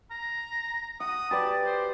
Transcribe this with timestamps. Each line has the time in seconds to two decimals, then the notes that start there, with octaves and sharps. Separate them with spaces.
0.11 A#5
1.00 F#5 D#6
1.31 G4 B4 D5 A5
1.65 C5